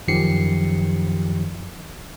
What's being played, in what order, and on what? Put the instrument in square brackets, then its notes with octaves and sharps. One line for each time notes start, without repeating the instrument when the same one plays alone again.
[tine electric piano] F#2 D#3 F3 G4 C7 C#7